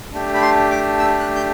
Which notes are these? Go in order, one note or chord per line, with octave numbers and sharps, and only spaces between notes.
A3 D4 G4
B5
C6
D6
E6
F#6
G6